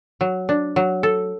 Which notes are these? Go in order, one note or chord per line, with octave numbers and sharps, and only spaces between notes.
F#3
D4
F#3
A4